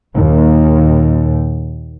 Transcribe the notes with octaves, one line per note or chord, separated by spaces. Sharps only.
D#2 A#2